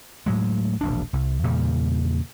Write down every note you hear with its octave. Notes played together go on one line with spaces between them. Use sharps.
A2 F#3 G#3
E1 A#1 D4
C2
E2 A#2 C#3 G3